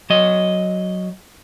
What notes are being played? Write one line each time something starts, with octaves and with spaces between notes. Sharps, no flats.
F#3 D#5